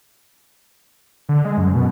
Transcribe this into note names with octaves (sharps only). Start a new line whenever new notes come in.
D3
G#3
F#2
B2